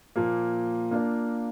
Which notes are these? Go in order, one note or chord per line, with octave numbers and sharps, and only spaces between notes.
A#2 F3 A#3
A#3 D4 F4 A#4